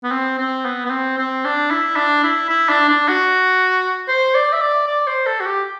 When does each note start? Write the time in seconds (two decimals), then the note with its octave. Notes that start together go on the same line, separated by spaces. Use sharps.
0.04 B3
0.11 C4
0.38 C4
0.65 B3
0.85 B3
0.91 C4
1.18 C4
1.45 D4
1.71 E4
1.96 D4
2.24 E4
2.49 E4
2.69 D4
2.89 D4
3.08 F#4
4.08 C5
4.34 D5
4.53 E5
4.61 D5
4.87 D5
5.07 C5
5.26 A4
5.40 F#4
5.46 G4